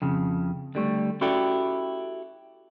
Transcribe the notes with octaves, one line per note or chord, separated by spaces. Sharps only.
F2 C#3
D3 G3 A3
C#4 E4 F#4 G4 A4 D5